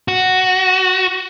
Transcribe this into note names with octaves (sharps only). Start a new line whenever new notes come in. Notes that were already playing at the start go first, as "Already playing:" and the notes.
F#4